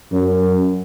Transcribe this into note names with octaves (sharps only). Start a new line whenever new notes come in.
F#2